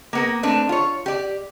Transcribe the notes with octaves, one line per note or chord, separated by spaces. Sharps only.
A#3 B3 A#4
A3 C4 D4 B4
F4 C#5
G4 D5